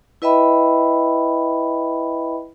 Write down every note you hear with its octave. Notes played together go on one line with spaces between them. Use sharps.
E4 B4 D#5 E5 G5 B5